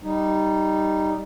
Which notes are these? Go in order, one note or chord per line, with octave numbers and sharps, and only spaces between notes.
G3 D#4